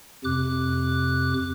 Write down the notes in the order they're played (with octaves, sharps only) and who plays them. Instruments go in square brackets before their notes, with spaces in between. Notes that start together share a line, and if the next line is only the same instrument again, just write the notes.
[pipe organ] F2 C3 D6 F#6